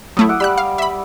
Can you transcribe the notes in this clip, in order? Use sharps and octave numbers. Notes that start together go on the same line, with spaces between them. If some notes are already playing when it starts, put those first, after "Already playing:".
F#3 A3 E4 D#6
E5 F#5 D6
G3 B5 E6 F#6
F5
E5 B5